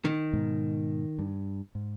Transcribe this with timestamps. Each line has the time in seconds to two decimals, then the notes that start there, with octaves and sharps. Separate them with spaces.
0.05 D#3
0.33 G#2 B2 G#3
1.19 G2
1.75 G#2